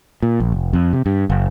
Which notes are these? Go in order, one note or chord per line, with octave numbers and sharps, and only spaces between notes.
A#2
A#1
F1
F2
C3
G2
F#1